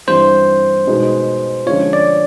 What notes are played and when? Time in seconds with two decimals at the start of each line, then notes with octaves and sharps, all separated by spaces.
0.07 G2 E3 G3 C4 C5
0.87 B2 G#3 B3 D#4 F#4
1.66 D3 F3 G#3 C#4 F4 C#5
1.93 D5